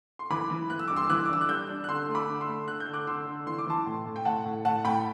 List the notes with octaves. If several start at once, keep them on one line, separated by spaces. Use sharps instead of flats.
C6
E3 B5 D6
E3
E3 F#6
E6
G2 D6
C6 E6
E3 D6 F#6
D6
D4 E6
F#6
G3 E6 G6
D4
F#6
D3 C6 E6
A3
B5 D6
D3
C6 E6
A3
D3 F#6
G6
D3
D6 F#6
D3 C6 E6
D3
E3 C6
D6
E3 A5 C6
A2
A2
G5
A2 F#5 A5
A2
A2 F#5 A5
A2 G5 B5